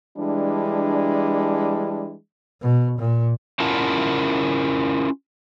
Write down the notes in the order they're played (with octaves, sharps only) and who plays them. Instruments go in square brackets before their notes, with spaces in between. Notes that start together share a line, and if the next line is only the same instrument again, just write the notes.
[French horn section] E3 G3 G#3 D4
[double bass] B2
A#2
[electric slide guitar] C#4 E4 F4 A#4 F#5 A5